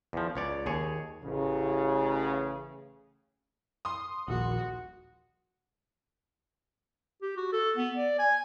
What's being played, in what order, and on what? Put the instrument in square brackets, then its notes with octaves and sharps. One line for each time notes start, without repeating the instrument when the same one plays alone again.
[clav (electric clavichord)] E2 F3
C#2 C#5 D5
D#2 G#4 C#5
[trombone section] A1 C#3
[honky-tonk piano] C6 D#6
[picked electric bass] D#1 A#1 [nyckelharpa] F#4
[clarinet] G4
F#4
A4
B3
D5
G#5